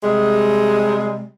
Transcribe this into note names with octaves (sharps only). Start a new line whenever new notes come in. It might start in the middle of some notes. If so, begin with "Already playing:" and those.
C3 G3 G#3